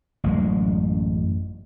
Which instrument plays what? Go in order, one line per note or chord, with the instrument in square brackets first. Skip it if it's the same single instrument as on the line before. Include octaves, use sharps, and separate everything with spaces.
[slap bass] A1 F#2 G#3